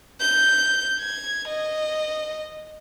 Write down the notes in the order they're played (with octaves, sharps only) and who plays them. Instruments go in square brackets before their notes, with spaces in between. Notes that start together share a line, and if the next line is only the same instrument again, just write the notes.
[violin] G6
G#6
D#5